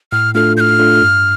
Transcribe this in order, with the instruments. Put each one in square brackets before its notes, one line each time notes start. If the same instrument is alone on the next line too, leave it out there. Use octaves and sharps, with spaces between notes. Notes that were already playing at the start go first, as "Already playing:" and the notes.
[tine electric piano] A2 [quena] F6
[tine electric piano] A3 D4 F4 A4 [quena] F6
[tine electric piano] A2 [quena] G6
[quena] F6
[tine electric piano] A3 D4 F4 A4
G2